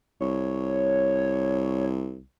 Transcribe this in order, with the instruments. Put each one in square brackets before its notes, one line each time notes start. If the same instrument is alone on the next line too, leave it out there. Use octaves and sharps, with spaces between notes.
[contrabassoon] C2 [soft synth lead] C#5